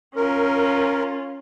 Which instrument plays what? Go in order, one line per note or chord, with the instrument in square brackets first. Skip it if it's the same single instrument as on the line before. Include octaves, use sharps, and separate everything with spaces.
[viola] C#4 F4 [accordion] A#4